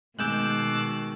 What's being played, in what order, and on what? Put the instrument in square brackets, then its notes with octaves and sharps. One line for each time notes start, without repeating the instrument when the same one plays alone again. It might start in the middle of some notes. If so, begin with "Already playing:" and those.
[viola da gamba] B2 D#3 [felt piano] G#3 G6 E7 [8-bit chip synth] D6 E6 F#6